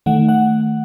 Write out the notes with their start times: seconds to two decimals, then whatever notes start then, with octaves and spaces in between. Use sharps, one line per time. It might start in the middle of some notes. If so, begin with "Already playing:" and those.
0.06 D#3 A3 F#5
0.29 F#5